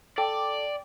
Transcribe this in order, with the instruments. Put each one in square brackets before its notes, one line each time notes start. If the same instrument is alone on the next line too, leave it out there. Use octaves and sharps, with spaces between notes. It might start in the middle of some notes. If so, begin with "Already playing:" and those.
[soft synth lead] A4 [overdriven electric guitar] D5 [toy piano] G5